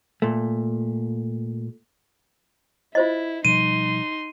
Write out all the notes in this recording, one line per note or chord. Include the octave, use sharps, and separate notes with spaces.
A#2 A3
E4 F4 C5 D#5
B2 F3 G3 D#4 C6 D#7